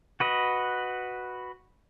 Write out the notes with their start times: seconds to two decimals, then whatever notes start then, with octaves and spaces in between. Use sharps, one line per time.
0.20 F#4 B4 D#5